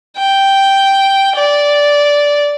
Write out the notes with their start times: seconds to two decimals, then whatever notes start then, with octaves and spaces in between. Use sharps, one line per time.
0.17 G5
1.36 D5